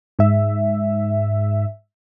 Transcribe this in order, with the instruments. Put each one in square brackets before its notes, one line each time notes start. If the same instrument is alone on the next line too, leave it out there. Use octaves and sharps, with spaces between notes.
[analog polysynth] G#2 E5